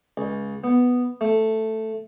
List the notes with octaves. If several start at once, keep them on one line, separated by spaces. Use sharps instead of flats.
C#2
B3
A3